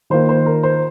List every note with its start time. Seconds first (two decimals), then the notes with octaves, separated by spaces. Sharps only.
0.10 D#3 A#3 F4 C5
0.29 C5
0.46 A#4
0.63 C5